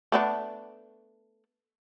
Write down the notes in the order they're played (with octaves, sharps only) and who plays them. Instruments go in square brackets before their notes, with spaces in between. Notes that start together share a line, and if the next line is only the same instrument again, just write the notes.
[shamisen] A3 B3 D4